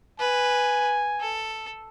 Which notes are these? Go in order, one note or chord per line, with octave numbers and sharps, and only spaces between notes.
B4 G#5
A4